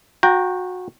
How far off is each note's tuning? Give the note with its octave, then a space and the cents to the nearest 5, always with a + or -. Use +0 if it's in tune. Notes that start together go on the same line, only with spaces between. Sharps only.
F#4 -25 G5 +0 A#5 +0